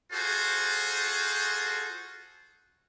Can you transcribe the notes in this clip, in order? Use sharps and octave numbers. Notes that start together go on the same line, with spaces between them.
F4 F#4 G#4 A4 C5